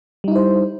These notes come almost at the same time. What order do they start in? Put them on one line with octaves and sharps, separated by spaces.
G3 D#4 E4 C5